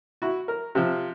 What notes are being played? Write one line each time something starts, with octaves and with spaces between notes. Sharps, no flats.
E4 F#4
A#4
C3 F3